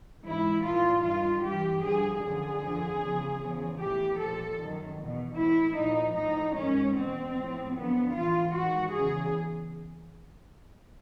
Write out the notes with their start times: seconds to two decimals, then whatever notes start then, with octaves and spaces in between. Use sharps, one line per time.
0.24 G#2 E3 E4
0.64 A#2 F3 F4
1.02 G2 D#3 F4
1.43 G2 E3 G4
1.82 G2 D3 F3 G#4
2.21 F#2 D3 F3 G#4
2.61 F2 D3 F3
3.00 E2 C#3 F3
3.40 E2 C#3 F3
3.80 A2 E3 G4
4.19 A#2 F3 A4
4.59 F#2 D#3
4.98 E2 B2
5.38 A2 E3 E4
5.77 A#2 F3 D#4
6.17 A2 F3 D#4
6.56 G#2 D#3 C#4
6.96 E2 B2 C4
7.35 A2 F3
7.75 F#2 D3 F3 B3
8.14 A2 E3 F4
8.54 G#2 D#3 F#4
8.94 E2 C#3 E3 G#4